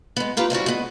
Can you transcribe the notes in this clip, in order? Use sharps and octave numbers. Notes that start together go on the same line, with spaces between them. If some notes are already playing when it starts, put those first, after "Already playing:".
G#3 B3
D#4 F4 G4 B4
F3 G3 E4 F#4
G#3 B3